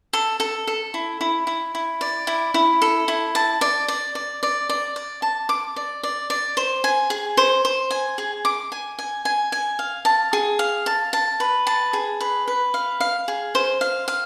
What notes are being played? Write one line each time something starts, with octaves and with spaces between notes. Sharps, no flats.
A4
A4
A4
E4
E4
E4
E4
D5
E4
E4
A4
E4
A5
D5
D5
D5
D5
D5
D5
A5
D6
D5
D5
D5
C5
G#5
G#4
C5
C5
G#5
G#4
D6
G#5
G#5
G#5
G#5
F5
A5
G#4
F5
A5
A5
B4
A5
G#4
B4
B4
F5
F5
G#4
C5
F5
F5